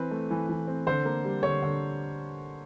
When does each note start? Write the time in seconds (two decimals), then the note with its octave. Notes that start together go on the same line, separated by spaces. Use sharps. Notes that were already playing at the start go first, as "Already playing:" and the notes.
Already playing: E3 C4 B4
0.11 A3
0.31 E3
0.49 E3
0.68 C4
0.87 D3 C5
1.05 A#3
1.25 G3
1.43 D3 C#5
1.63 D3